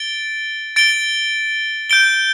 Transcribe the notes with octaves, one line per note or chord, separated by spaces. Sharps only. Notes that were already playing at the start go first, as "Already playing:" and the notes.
Already playing: A6 D7 G7
A6 D7 G7
G6 D7 G7